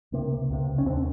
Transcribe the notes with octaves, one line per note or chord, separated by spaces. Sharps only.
C#2 C3 A#3
C#2 C3
C#4
D#2 D3 C4